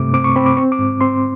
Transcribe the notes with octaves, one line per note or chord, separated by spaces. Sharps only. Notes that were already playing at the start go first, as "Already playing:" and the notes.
Already playing: G2 C3 A3 D6
C4 D6
C#6
C4 B5
D6
C4 C#6
D6
G#2
C4 C6